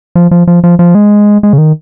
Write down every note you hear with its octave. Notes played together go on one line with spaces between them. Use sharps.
F3
F3
F3
F3
F3
G#3
G#3
C#3
D#3